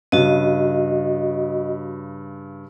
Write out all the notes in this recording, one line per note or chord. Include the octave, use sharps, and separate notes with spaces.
G2 C#3 F#4 D#5